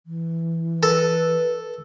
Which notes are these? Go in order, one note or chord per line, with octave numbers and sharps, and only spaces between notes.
E3
A4 B4